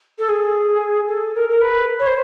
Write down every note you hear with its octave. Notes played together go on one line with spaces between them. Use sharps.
A4
G#4
A4
A#4
A#4
B4
C#5
C5